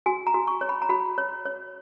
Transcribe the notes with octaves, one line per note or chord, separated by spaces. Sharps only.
F#4 G#5
A#5
F#4
C#6
C#5
B5
A#5
F#4 B5
C#5
C#5